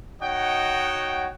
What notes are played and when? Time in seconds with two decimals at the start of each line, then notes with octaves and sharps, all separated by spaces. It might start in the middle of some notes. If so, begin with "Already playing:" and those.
0.21 D#4 F#4 C#5 D#5 F#5 G5